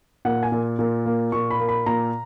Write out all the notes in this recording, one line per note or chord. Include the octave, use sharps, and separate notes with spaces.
A#2 F#5
G#5
A#2
A#2
A#3
A#2 C#6
B5
A#3
B5
A#2 A#5